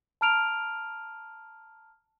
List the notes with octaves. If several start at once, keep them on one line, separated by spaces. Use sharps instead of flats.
A5 A#5 F6 D7 F7